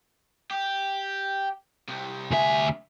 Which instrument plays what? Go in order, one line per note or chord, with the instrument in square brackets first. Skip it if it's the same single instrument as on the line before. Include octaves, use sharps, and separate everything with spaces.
[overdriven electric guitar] G4
C2 C3
[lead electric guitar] D2 E5 [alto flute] G#5